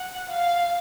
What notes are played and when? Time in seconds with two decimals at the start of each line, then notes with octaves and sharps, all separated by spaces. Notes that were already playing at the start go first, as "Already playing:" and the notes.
Already playing: F#5
0.30 F5